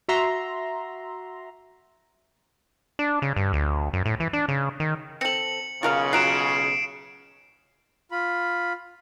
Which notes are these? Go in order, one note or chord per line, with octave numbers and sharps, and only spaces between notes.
F#4 E5 A#5 C6
D4
C#3
G2
D2
F#2
A2
E3
D4
C#3
D#3
C4 A4 C#7 F#7
B1 C#3 F4 A#4 F5
F#3 F4 A#5 C7 D7 E7
F4 B5